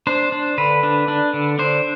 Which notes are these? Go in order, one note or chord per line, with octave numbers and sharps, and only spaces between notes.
D4 C5
D4
D3 B4
D4
D4
D3
D4 C5